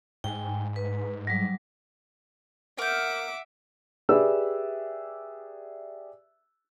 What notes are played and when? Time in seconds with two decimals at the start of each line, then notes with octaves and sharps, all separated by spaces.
0.24 G#2 G5 G#5
0.76 B4
1.27 F#3 G3
2.78 A#4 E5 F#5 D6 G6
4.09 G4 G#4 B4 D5 E5 E6